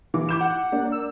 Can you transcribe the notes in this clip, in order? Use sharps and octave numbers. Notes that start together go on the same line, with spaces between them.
E3 D6
E4 D6 G6 E7
F#5
A#3 D4
E6